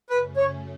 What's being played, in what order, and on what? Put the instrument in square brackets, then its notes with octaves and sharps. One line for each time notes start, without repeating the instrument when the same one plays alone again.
[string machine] F#2 C#3 A3 C#4 [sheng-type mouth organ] B4
[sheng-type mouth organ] C#5